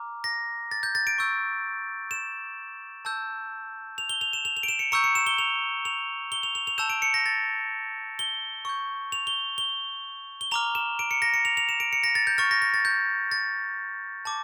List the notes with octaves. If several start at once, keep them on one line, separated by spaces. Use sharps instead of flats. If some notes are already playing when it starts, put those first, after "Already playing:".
Already playing: A#5 D6 F6
A#6
A6
G6
A6
D7
C#6 E6 G6
E7
A5 E6 G6
F7
G7
F7
E7
F7
F7
D7
E7
C#7
A#5 C#6 E6 G6 C#7
C#7
E7
G7
F7
F7
G7
F7
F7
F7
A5 E6 G6 E7
D7
C#7
A#6
A6
G7
C#6 G6
F7
G7
G7
G7
A#5 D6 F6 F7
E7
D7
C#7
A#6
C#7
F7
F7
E7
D7
C#7
A#6
A6
G6
C#6 F6 A6
A#6
A#6
A6
G6
A6
A5 D6